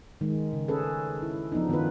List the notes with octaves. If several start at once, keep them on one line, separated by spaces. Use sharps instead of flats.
D#3 G#3
C#3
C#4 G#4 A4 B4
E4
F3 B3 D4 D#4
D#3 B3 C#4 F4 B4